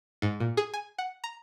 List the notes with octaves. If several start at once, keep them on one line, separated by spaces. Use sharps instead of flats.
G#2
A#2
G#4
G#5
F#5
A#5